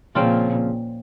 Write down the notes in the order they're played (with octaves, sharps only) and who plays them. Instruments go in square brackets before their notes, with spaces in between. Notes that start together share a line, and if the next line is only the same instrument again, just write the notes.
[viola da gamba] A#2 [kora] C#3 F3 C4 F4